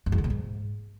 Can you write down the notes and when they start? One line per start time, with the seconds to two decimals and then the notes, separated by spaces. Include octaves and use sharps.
0.06 F#2
0.12 E2
0.18 D3
0.24 A2
0.30 G#2